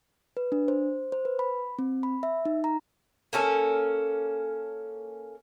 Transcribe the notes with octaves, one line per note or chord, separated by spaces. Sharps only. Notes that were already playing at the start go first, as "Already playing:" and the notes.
B4
D4
C5
C5
B4
B5
C4
B5
E5
D#4
A#5
A#3 C#4 A4